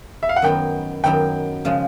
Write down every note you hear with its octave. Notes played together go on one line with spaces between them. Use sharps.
E5
F5
F#5
F#2 D#3 F#3 B3 G5
F#2 D#3 F#3 B3 G5
C#3 F3 G#3